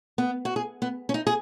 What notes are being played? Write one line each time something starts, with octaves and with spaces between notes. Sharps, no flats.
B3
F#4
G#4
B3
C#4
D#4
G#4